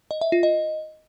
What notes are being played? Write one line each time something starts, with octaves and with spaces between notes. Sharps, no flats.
D#5
E5
F4
D#5